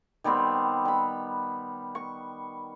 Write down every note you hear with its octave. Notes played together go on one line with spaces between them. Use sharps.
D#3 G3 B3 C4
G3 B5
C#6